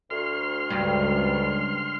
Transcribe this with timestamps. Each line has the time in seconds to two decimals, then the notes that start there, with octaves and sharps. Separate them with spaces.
0.10 D2 C6 F6
0.70 C#2 G2